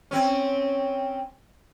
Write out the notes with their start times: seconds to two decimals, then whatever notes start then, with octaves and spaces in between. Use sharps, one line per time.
0.11 C4 C#4